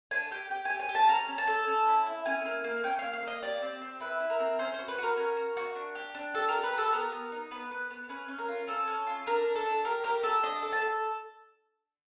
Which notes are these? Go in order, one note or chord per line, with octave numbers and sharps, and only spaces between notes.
D4 G#5
G4 G5
G4 G5
G4 G#5
G#5
G4
A5
C#4 A#5
C#4
A5
A4
C#4
E4
E4
C#4 G#5
A#3
A#3
C#4 G5
A#3 F5
F5
A#3 D#5
G4 D5
C4
C4
E4 B4
E4
A#4
C4
C#4 C5
C5
F#4
B4
F#4 A#4
C#4
F#4
F#4
D4
G4
D4
G4 A4
A#4
G4
B4
G4 A4
B3 A#4
B3
D#4
B3 B4
B3
B3
C#4 B4
C#4
A#4
F4
C#4 A4
C#4
F4
D4 A#4
D4
A4
D4
G4 A#4
G4 A#4
G4 A4
D4 D#5
A4
A5
A4